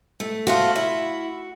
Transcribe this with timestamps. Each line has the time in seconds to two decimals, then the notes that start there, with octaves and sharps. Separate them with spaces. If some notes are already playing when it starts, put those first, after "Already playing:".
0.20 A3
0.47 F3 A3 F4 F#4
0.76 E4